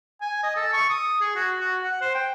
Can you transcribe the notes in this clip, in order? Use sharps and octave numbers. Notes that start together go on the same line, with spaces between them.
G#5
D#5
A4
C#6
D#6
G#4
F#4
F#4
F#5
C5
G5